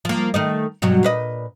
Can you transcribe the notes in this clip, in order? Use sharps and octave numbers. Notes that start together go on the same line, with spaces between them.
F3 A#3
D#3 A3 D#5
G2 B2 F#3
A#2 B4 D#5